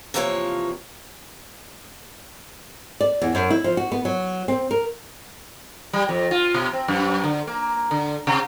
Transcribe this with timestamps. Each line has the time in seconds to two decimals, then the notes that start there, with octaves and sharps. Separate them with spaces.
0.14 C3 E3 F3 A#3 F4 C#5
3.01 D5
3.22 E2
3.35 F#2
3.51 E4
3.64 F3
3.77 F#4
3.92 B3
4.05 F#3
4.48 C4
4.71 A#4
5.93 G3
6.09 F2
6.31 F4
6.54 B2
6.73 C4
6.88 F#2
7.24 D3
7.47 A#3
7.91 D3
8.27 C3